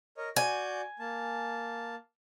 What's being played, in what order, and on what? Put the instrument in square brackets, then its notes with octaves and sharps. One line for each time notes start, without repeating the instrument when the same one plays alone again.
[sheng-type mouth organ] A#4 C#5 D#5
[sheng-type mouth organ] F#4 D5 G6 [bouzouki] G#5
[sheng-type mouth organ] A#3 A5